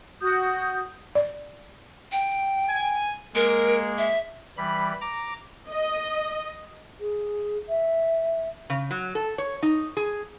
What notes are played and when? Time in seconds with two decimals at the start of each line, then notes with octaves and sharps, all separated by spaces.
0.21 F#4 D#6 G6
1.15 D5
2.12 G5
2.68 G#5
3.35 G#3 A#3 A#4
3.98 E5
4.57 E3 G3 B5
5.01 A#5 D6
5.70 D#5
7.00 G#4
7.69 E5
8.70 C#3
8.91 F#3
9.15 A4
9.38 C#5
9.63 D#4
9.97 G#4